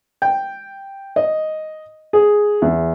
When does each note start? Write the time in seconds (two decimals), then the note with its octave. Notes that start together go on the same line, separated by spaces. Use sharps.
0.22 G5
1.16 D#5
2.13 G#4
2.62 E2